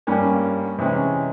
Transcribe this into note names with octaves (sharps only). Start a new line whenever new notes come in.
G2 G3 A#3 C#4
C3 E3 G#3 C#4